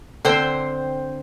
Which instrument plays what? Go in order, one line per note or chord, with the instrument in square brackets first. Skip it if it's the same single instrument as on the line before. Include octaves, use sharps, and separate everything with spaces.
[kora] D3 C4 [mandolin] C5 G5 C6